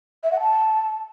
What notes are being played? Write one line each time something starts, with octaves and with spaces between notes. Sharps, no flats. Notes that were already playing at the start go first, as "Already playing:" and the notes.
E5
F#5
A5